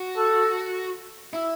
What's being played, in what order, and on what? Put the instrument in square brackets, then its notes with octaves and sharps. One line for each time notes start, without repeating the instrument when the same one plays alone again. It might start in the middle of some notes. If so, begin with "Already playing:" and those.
Already playing: [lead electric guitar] F#4
[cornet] A4
[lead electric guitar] E4